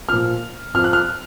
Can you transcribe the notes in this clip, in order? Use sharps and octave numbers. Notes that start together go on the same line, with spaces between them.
A#2 F3 F6
F2 F3 F6
F#6
F6